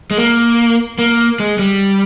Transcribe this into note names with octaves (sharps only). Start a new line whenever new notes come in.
G#3
A#3
A#3
G#3
G3